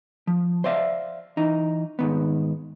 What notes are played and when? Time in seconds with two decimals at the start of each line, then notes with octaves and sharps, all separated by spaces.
0.27 F3
0.64 C5 D5 E5 F5
1.37 E3 D#4
1.99 G#2 D#3 B3